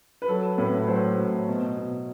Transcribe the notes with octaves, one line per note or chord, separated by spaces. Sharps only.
B4
F#3 A4
A2 B4
F#3 C5
A2
B2
B2